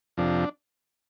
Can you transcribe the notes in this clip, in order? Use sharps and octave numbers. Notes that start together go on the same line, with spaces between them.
F2 C3 F3 D4